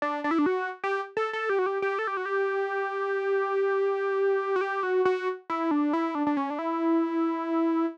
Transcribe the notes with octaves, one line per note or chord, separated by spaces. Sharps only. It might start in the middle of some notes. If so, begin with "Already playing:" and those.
D4
D4
E4
D4
F#4
G4
A4
A4
G4
F#4
G4
G4
A4
G4
F#4
G4
F#4
G4
F#4
F#4
E4
D4
E4
D4
D4
C#4
D4
E4